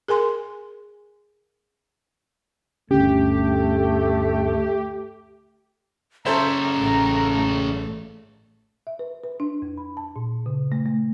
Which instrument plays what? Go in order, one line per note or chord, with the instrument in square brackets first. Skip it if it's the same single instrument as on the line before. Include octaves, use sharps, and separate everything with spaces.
[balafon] G#4 A#4 G#5 C6
[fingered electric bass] G1 D2 C#4 [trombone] A3 [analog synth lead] G4
[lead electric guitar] F#2 C#3 [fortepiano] A4 C5 E5 [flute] A#5
[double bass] A1 A3
[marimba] E5
B4
B4
D4
F2
B5
A5
A#2
C#3
A3
A3